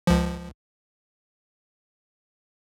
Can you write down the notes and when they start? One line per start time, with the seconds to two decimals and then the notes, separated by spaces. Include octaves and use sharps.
0.07 C#2 F3